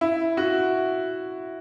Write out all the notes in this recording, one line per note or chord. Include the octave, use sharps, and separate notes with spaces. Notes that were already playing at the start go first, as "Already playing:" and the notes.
E4
F#4